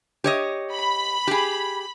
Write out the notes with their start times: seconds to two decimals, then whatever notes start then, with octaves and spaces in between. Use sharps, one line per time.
0.24 G4 C#5 D#5
0.74 B5
1.27 G4 G#4